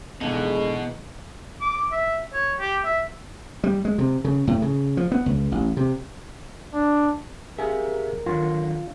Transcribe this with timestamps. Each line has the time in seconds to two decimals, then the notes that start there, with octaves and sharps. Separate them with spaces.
0.21 B1 E2 B2 D3 F3 G#3 D#4 D#5
1.61 D6
1.92 E5
2.33 C#5
2.59 G4
2.85 E5
3.64 G3
3.85 G#3
3.98 C3
4.25 C#3
4.47 A2
4.62 C#3
4.97 F3
5.12 B3
5.26 C#2
5.52 A1
5.77 C3
6.73 D4
7.58 G4 G#4 A#4 E5 F5
8.26 D3 D#3 F#3 F4